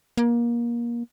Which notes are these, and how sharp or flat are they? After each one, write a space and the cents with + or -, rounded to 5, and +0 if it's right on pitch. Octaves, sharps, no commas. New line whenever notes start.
A#3 +25